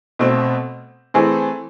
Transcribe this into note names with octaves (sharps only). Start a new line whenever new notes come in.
B2 A3 C4
E3 A3 C4 G#4